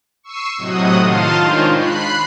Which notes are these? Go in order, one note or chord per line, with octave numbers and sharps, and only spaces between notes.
C#6 E6 C7 D#7
A2 C3 F#3 D#5 F#5 D#6
D#3 F4 F5 A5 C6 D#7
D#3 G#3 D4 F4 C5 C#5
B5 F#6 C7